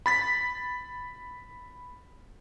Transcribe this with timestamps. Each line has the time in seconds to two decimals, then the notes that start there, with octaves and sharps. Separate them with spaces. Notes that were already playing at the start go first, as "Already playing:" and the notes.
0.06 B5 A6 B6